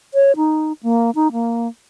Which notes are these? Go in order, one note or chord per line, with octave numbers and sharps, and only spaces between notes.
C#5
D#4
A#3
D#4
A#3